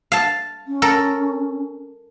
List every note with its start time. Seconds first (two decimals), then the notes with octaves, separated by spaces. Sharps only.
0.12 F5 A5
0.67 C#4
0.82 A4 A#4